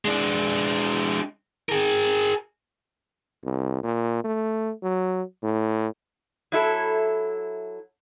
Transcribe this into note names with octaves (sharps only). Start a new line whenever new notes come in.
G#3 D4
G#4 A#4
C2
A#2
A3
F#3
A2
F#3 E4 A4